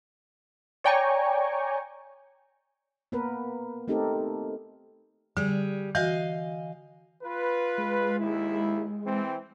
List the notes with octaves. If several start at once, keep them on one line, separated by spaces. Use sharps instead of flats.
C#5 D5 G5 G#5 A#5 C#6
A#3 B3 A#4 B4
A3 C4 D#4 G4 A4 A#4
D3 G3 G#4
E3 F#4 D#5 F5 G#5
F4 B4
G#3
D#2 E4
E3 C4